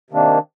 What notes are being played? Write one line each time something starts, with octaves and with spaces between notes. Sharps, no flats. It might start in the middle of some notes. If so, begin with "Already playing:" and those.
C3 D#3 A#3 D4